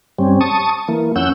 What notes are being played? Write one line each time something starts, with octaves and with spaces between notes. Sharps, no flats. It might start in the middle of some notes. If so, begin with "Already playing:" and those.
G2 G3 C4 C#4
A5 C#6 D#6
E3 A#3
F2 C#4 F#5 E6 G6